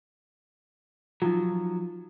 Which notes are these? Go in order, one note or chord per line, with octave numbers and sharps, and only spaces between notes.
F3 F#3 D#4 F4